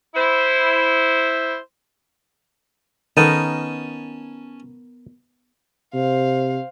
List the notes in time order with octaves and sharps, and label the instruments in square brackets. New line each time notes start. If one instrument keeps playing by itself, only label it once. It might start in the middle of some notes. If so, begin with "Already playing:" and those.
[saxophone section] E4 C5
[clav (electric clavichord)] D#3 A4 [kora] B3 D#4 A#4 [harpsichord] C#4 G#5 A5
[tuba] C3 [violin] C5 F5